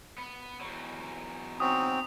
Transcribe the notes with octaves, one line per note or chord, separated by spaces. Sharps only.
B3
E2 F#3
C4 C#4 D#4 F#4 D#6